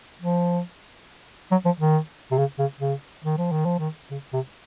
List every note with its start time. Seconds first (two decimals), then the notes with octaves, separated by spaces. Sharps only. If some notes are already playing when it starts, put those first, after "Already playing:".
0.21 F3
1.51 F#3
1.65 F3
1.80 D#3
2.32 C3
2.38 C#3
2.59 C#3
2.80 C#3
3.25 D#3
3.38 F3
3.52 D#3
3.65 F3
3.79 D#3
4.11 C#3
4.33 C3